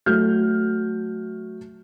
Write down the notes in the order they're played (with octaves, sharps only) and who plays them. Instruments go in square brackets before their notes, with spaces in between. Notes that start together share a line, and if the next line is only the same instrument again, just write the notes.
[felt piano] F#3 A3 F6 G6